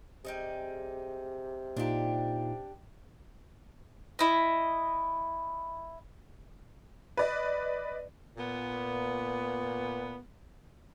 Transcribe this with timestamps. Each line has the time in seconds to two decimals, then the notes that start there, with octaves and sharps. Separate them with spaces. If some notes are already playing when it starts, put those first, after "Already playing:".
0.25 C3 G3 D#4 G#4
1.77 A#2 D4 D#4 F4 G4
4.19 E4 D#5
7.17 B4 D5 D#5
8.38 A#2 B3